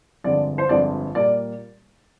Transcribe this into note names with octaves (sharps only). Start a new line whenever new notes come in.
G1 F2 D3 G#3 D5
C5
G1 F2 D3 G#3 D5
A#2 G3 A#3 D5